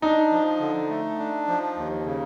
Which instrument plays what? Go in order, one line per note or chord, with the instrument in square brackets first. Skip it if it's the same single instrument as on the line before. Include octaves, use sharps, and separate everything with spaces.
[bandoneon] D4 [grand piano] D#4
[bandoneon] F3
D3
A3
D4
F3
D#2
C#3